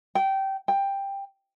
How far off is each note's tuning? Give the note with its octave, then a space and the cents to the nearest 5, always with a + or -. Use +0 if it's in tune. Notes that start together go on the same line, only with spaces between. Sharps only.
G5 -20
G5 +10